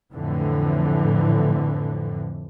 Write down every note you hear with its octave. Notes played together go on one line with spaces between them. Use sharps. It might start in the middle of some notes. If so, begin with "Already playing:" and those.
F2 A2 D3 E3